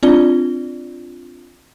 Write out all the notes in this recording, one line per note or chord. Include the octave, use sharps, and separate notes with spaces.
C4 D4 F4 D5 G7